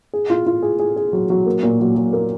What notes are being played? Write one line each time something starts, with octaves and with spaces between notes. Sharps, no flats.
G#4
F4
F4
G#4
G#4
G#4
F#3
F#3
A#3
A#2
F#3
F#3
A#3